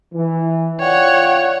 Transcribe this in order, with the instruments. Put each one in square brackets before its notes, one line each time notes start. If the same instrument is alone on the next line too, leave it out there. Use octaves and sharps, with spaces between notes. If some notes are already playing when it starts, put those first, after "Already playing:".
[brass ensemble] E3
[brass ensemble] F4 D5 G5 [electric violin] C#5 F#5